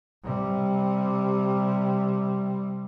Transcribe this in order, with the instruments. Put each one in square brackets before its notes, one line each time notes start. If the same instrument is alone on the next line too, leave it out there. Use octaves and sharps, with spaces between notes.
[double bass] C3 G3